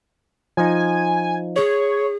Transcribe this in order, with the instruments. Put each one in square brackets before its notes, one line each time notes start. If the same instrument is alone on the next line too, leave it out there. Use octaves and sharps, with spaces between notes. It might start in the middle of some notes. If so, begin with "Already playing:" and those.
[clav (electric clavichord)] F3 D#4 [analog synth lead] G#5
[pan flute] G#4 [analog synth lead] C#5